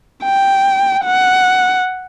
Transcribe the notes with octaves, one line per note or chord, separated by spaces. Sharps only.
G5
F#5